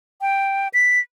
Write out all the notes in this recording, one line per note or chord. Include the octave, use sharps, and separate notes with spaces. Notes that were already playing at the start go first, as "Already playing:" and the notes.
G5
B6